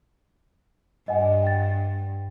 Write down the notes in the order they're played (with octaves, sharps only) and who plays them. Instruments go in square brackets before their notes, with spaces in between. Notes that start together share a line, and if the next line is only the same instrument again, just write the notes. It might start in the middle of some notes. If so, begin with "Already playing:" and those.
[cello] G2 [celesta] D#5 F#5 G#5
[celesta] G5 A6